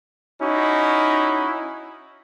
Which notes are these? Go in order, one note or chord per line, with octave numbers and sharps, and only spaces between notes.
C#4 D#4 E4 F#4